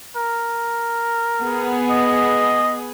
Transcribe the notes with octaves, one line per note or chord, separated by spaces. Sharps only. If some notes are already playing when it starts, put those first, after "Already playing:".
A#4
B3 G#4
D#5